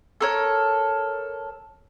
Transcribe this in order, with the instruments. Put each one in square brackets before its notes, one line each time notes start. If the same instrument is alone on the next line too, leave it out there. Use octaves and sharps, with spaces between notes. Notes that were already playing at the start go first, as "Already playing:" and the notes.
[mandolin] A4 A#4 C#5